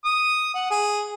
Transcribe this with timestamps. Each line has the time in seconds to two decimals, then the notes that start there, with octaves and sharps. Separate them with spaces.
0.05 D#6
0.54 F#5
0.71 G#4